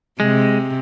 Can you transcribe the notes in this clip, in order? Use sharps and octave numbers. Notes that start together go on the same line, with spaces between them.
C3 G#3